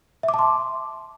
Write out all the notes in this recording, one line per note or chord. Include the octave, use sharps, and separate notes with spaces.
E5
D6
A5
C6